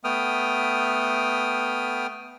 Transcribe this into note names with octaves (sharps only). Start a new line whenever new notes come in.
A3 B3 G5 D#6 F6